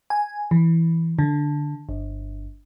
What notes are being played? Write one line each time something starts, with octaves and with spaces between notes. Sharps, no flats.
G#5
E3
D3
G1